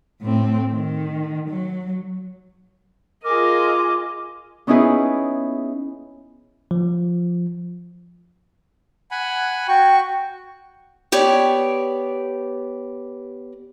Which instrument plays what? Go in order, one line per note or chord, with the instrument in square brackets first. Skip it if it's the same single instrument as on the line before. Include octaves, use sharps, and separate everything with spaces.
[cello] A2 C4
D#3
F#3
[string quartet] F4 G#4 D#5 [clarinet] A#4 [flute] D6
[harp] B3 C#4 D#4 E4 G#4 B4
[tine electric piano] F3
[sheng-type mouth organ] F#5 G#5 B5
[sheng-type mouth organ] F#4 C#6 [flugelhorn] G5
[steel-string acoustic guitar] B3 G4 C#5 D5